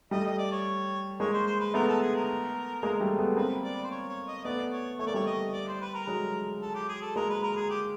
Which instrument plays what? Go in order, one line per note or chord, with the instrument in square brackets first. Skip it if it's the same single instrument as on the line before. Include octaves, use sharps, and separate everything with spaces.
[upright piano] G3 A3 [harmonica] D#5
[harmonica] D#5
D5
C#5
[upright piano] G#3 A#3 [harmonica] C#5
[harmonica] C5
C5
B4
[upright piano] A3 B3 [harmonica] A#4
[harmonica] A4
G#4
A#4
[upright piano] G#3 A#3
G3 A3
A3 B3
[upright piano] A#3 C4 [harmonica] B4
[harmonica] D5
B4
C5
C#5
C#5
D#5
[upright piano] A3 B3 [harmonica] D5
[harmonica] C#5
[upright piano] A3 [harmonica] C#5
[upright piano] A#3 [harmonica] D5
[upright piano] G3 A3 [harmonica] C#5
[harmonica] D#5
D5
C5
B4
A#4
[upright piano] F#3 G#3
[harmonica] A4
G4
G#4
A4
[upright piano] G#3 A#3 [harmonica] A#4
[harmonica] B4
A#4
G#4
G4